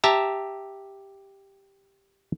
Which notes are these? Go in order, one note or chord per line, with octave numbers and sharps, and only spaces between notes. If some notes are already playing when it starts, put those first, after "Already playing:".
G4 E5 A5 A#5